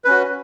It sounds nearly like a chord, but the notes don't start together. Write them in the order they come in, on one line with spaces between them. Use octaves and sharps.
B4 C#4 F#4